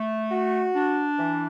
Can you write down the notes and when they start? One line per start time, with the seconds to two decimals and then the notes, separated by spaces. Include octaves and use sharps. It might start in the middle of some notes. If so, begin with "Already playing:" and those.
Already playing: A3
0.31 F#4
0.75 D4
1.19 E3